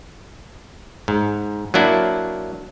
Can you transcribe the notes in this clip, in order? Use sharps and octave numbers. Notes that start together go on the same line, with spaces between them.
G#2
F#3 A#3 D4 E4